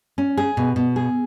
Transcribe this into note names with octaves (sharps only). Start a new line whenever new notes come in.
C#4
G#4
B2
B2
G#4